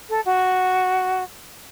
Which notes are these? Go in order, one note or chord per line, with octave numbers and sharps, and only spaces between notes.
A4
F#4